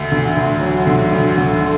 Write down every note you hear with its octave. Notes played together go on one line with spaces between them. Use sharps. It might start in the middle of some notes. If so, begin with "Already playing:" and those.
Already playing: D2 D3
D3
D2
F#3
D3
D2
D3
A3